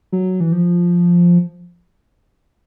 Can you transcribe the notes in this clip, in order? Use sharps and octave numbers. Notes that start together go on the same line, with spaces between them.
F#3
E3
F3